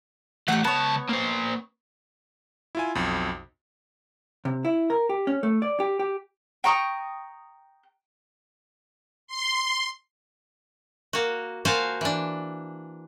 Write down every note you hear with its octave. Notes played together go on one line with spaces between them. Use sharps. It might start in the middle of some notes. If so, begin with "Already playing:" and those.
E3 A3 G4 F#5
C#2 B3 C#5 A5
A#3 C5
E4 F4 G#5
B1 F2
C3
E4
A#4
G4
C#4
A3
D5
G4
G4
G5 A#5 C#6 D#6
C6
A#3 F#4
A#3 F4 F#4 C5 G#5 A5
E3 D4